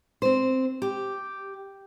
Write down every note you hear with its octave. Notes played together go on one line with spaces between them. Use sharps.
C4 C5
G4